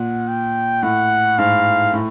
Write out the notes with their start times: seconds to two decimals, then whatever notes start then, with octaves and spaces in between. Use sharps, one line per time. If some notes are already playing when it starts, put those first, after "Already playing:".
Already playing: A#2 F#5
0.28 G5
0.83 A2 F#5
1.38 G#2 F5
1.93 A2